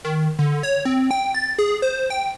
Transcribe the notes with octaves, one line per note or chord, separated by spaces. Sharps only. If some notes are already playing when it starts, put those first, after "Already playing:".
D#3
D3
C#5
C4
G5
A6
G#4
C5
G5